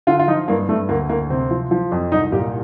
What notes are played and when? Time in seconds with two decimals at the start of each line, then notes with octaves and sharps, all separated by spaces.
0.07 D3 F4
0.19 F4
0.28 F3 D#4
0.48 G2 A#3
0.69 G2 A3
0.89 D2 A#3
1.09 D2 A#3
1.30 C3 C4
1.51 F3
1.71 F3
1.92 F2
2.12 C2 D#4
2.32 A#2 G4